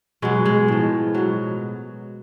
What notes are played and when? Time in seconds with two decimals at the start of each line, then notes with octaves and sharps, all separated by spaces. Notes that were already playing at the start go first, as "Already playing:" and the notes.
0.22 B2 F#3 G#3
0.45 G#3
0.68 A2 F3
1.15 B2 F#3